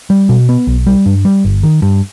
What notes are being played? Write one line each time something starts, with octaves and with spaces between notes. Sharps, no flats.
G3
B2
B3
B1
G3
G2
G3
G1
D#3
G2